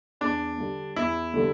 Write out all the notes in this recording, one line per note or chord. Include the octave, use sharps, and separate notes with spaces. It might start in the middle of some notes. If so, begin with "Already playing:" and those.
E2 D4
D3 G3
E2 E4
D3 G3